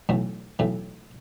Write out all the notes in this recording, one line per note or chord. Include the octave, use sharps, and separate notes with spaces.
B1 A2 E3 A3
B1 A2 E3 A3